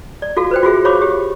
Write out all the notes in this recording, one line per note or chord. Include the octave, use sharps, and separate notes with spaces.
D5
F4 F#4 A4 F5
B4 C5 G5
F4 F#4 G#4 E5
C5 C#5 F5 B5 C#6 D6
G4